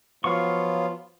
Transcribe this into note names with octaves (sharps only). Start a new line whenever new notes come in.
F3 F#3 B3 F4 F5 C#6